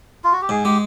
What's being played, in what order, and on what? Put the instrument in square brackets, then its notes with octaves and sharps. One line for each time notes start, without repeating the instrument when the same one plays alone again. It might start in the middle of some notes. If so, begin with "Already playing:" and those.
[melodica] F4
F#4
G4
[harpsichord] G#2 [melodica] G#4
[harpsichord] G#3 [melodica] G4